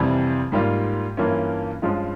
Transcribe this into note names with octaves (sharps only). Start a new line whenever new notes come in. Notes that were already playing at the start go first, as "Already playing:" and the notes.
Already playing: F2 C3 E3 G3
G#2 G3 A#3 F4
G2 E3 A#3 C#4 F4
G2 F3 G#3 C#4 F4